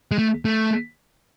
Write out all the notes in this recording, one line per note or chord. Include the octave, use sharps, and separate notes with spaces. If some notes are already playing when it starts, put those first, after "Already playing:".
G#3
A3
A3